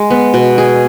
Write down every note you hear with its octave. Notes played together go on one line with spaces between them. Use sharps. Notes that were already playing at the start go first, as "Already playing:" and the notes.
Already playing: G#3
B3
B2
G#4